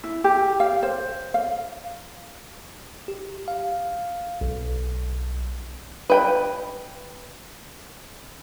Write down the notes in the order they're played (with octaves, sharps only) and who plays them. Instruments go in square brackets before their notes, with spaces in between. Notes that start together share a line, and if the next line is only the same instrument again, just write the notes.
[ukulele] E4
G4
F5
C5
F5
[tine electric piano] G4
F5
B1
[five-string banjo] B4 G5 B5